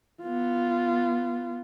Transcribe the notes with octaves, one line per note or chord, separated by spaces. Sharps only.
B3 F4